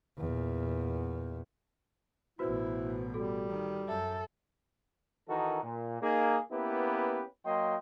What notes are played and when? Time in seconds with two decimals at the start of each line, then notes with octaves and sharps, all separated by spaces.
0.18 E2 A#2
2.39 A1 B2 E4 F#4 B4 C5
3.14 G3 F#4 A4
3.49 D#3
3.88 F#2 A4 E5
5.28 D#3 E3 D#4 F#4 A4 A#4
5.63 A#2
6.02 A#3 D#4 G#4
6.51 A#3 B3 C#4 E4 G4 B4
7.45 F#3 A#3 D#5 G5 C6